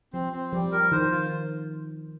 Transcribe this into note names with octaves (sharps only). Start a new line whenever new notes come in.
F3 C4
C4
F3 G3
A#4
D#3 C5
F4